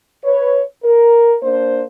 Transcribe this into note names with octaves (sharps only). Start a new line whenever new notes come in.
B4 C#5
A#4
A#3 D4 C5